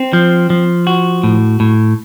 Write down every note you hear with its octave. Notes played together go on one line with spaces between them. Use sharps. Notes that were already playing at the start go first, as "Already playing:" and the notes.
Already playing: C4
F3
F3
F#4
A2
A2